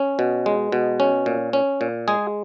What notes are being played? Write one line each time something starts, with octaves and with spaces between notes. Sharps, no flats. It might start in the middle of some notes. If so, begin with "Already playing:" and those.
Already playing: C#4
B2
G#3
B2
C#4
A#2
C#4
A#2
G#3 G#4